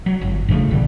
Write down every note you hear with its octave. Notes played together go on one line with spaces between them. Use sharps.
F#3
G1
G2 C#3 F3 A3
A#1 D3 G3